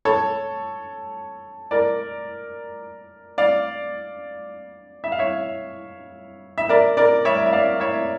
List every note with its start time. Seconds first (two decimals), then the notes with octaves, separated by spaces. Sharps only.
0.05 A4 C#5
1.71 A#4 D5
3.38 D5 F5
5.04 E5
5.12 F5
5.19 C#5 E5
6.58 E5
6.69 A#4 D5
6.97 A#4 D5
7.25 C#5 E5
7.46 E5
7.53 D5 F5
7.80 C#5 E5